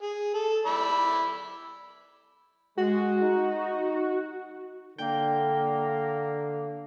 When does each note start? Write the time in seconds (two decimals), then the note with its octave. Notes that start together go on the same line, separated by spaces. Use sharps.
0.02 G#4
0.34 A4
0.66 D5 B5 E6
2.78 G#3 F#4
3.22 D#4
4.98 D3 A#3 G5